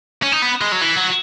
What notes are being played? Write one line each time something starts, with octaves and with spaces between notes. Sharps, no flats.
C#4
D#4
B3
G#3
F#3
E3
F#3